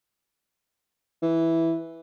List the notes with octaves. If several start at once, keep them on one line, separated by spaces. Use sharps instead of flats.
E3